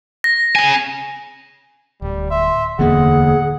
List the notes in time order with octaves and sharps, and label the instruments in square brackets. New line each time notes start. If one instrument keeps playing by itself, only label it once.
[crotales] A#6
[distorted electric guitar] C#3 G#5
[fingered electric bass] D1 [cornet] G3
[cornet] E5 [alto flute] C6
[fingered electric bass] D1 E2 [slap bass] D3 A#3 [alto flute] G#4 [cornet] F#5